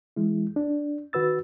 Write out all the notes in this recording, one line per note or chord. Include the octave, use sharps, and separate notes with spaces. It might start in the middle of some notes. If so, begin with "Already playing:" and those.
E3 G#3 E4
D4
D#3 F#4 B4 E6 A6